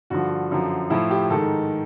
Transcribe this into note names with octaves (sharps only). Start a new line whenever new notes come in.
G2 D3 F3 F#4
F#2 D3 F3
A2 F3 E4
G4
G#2 D#3 A4